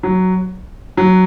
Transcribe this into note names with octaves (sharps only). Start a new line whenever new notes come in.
F#3
F#3